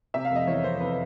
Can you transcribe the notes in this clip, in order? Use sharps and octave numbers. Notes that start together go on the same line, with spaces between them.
C3 E5
F5
F1 D#5
E2 C#5
F1 C5
C3 B4